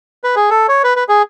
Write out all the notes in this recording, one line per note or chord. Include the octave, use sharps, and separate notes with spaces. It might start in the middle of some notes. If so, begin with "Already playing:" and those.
B4
G#4
A4
C#5
B4
B4
G#4